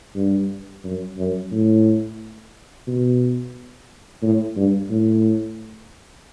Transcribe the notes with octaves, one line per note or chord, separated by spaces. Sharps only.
G2
F#2
F#2
A2
B2
A2
G2
A2